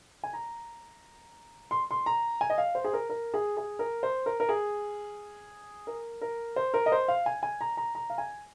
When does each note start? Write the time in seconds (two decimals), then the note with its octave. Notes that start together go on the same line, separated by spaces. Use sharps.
0.24 G#5
0.33 A#5
1.71 C6
1.91 C6
2.06 A#5
2.41 G#5
2.50 D#5
2.58 F5
2.75 C5
2.84 G#4
2.93 A#4
3.10 A#4
3.34 G#4
3.57 G#4
3.79 A#4
4.03 C5
4.26 A#4
4.40 A#4
4.49 G#4
5.87 A#4
6.21 A#4
6.56 C5
6.74 A#4
6.86 D#5
6.92 C5
7.08 F5
7.26 G#5
7.43 G#5
7.61 A#5
7.77 A#5
7.95 A#5
8.10 F5
8.18 G#5